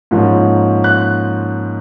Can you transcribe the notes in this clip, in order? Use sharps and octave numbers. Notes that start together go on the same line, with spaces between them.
G#2 F3 A#3 C#4
F#6